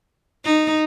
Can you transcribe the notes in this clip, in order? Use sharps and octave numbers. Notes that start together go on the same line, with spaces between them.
D#4